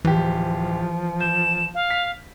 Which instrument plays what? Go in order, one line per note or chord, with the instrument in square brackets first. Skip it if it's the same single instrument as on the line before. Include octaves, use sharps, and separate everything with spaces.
[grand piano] D1 G4 [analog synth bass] E3 [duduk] F3
[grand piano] G6 [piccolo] E7
[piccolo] F5
[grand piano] B6